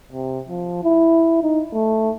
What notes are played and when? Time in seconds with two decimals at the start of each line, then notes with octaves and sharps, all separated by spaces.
0.13 C3
0.48 F3
0.84 E4
1.43 D#4
1.74 A3